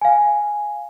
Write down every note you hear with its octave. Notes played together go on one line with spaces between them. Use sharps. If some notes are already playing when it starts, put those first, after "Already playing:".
F5 G#5